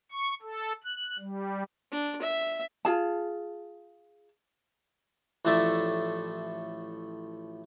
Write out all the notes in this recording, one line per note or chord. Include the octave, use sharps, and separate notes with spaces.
C#6
A4
F#6
G3
D4
E5
F4 G#4 A5
A1 A2 F3 A3 D5 E5